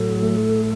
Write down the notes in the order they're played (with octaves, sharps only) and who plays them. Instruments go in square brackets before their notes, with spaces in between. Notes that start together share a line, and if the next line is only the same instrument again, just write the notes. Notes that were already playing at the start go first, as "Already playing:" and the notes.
Already playing: [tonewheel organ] A2 F#3 [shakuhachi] A4
[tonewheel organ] A3